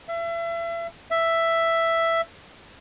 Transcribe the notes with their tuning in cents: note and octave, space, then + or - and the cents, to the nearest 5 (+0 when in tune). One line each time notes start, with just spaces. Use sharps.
E5 +35
E5 +5